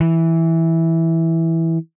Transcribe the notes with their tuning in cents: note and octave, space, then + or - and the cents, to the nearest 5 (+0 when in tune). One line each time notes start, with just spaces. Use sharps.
E3 -5